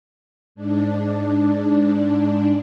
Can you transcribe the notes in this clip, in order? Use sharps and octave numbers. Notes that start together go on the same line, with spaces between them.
G#2 D4